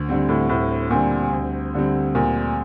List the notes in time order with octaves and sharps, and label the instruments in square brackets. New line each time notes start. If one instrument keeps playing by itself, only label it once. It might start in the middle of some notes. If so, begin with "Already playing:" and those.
Already playing: [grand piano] D2
D3 G3 C4
[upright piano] A2
[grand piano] D2 [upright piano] A2
[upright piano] A#2 [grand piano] D3 G3 C4
[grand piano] D2
D3 G3 C4
[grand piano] D2 [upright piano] A#2